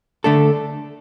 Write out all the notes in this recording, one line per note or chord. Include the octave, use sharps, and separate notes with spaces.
D3 A3 D4 A4